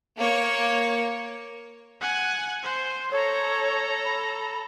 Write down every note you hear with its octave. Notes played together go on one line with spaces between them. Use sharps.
A#3 C#5
F#5 G#5
C5
A4 C#5 A#5
B5